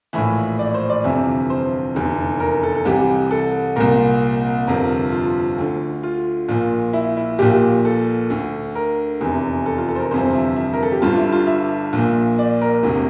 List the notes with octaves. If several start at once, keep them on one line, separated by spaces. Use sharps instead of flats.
A#1 A2 E3 E5
D5
C5
D5
G1 F2 C3 E3 E5
C5
F1 E2 D3
A#4
A4
A4
C2 C3 E3 G4
A4
C2 A#2 A#4
G1 F2 C3 A#4
F4
D2 D3
F4
A#1 A#2
E4
E4
A#1 A#2 G4
A4
D2 D3
A#4
F1 E2 C3 E3
A4
F4
A4
C5
A#4
G1 F2 C3 E3 C5
E5
E5
A#4
A4
G4
G1 G2 D3 F4
E4
F4
E5
A#1 A#2
D5
A#4
E1 D2 C3